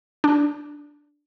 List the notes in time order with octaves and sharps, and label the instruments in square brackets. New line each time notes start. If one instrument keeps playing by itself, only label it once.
[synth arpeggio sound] D4